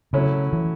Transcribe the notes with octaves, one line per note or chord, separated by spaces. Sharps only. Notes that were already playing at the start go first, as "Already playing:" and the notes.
C#3 F#3 A3 C#4 E4
E3